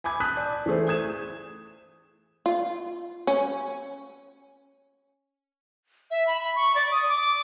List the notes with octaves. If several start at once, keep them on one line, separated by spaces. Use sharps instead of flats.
G#5 B5 D6 G#6
A5 D#6 F#6 G6 B6
D5
E3 A3 G#4 C5
D#6 G#6 E7
F4
C#4
E5
B5
B5
C#6
D5
D#6
D6